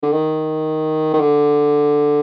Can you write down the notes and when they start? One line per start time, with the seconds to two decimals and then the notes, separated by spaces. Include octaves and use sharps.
0.03 D3
0.13 D#3
1.14 D#3
1.20 D3